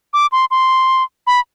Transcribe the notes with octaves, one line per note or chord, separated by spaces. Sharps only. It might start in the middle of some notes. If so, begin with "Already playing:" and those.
D6
C6
C6
B5